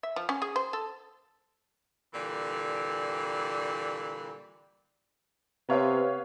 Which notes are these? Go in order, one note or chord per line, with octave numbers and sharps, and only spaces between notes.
E5
F3
C#4
G#4
C5
A4
A#2 D3 E3 G3
C3 B3 C#5 F5